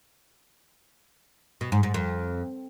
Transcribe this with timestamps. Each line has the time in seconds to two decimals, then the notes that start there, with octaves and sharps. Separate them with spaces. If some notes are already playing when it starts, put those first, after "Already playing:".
1.61 B2
1.72 G#2
1.83 G#2
1.94 F2